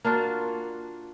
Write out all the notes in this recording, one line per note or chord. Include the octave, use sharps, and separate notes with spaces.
A#3 D4 F4 F#4